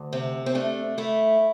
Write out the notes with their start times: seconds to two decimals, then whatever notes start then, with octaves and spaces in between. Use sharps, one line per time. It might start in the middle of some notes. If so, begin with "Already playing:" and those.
Already playing: D2
0.13 C3 C4
0.46 C4
0.55 A3 D4
0.98 A3 E4